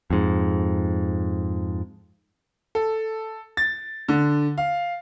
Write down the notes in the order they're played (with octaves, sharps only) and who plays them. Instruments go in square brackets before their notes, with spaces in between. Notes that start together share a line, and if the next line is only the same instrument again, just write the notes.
[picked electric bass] F2 G#2
[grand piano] A4
A6
D3
F5